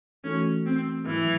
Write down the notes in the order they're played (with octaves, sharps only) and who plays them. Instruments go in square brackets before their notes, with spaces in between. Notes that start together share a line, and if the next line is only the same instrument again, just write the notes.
[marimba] E3 A3 D#4 F#4 A4 [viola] C#4
[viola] C4
[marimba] G#2 D#3 F#3 [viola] E3